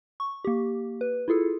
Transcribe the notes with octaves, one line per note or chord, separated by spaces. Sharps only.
C#6
A#3 G4
B4
E4 F4 G#4 A4